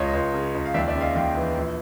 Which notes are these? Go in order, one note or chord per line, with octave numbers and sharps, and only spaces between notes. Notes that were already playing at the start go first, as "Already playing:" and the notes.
Already playing: C#2 C#5 D#5
C#2
C#3
C#2
F5
D#2 D5 E5
D5 E5
C#3
D#5 F5
D#2 F5 G5
E3
A#1